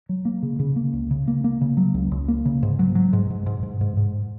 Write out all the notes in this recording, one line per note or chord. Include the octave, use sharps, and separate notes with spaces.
F#3
A#3
C#3
C#3
A#3
C#2
C#3
A#3
A#3
C#3
F#3
C#2
C#2
A#3
C#3
G#2
F#3
F#3
G#2
G#2
G#2
G#2
G#2
G#2